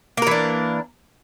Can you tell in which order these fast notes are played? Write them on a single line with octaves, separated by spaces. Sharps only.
A#3 A#4 E3 D4